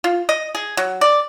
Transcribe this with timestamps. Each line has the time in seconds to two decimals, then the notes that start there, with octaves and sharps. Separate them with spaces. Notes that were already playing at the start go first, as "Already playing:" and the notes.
0.04 F4
0.29 D#5
0.55 G#4
0.77 F#3
1.01 D5